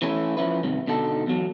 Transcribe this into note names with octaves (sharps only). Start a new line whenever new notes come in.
E3 A3 C#4 E4
F3 C#4 E4 B4
G2 C3 D#3
B2 D3 D#4 A4
E2 F#3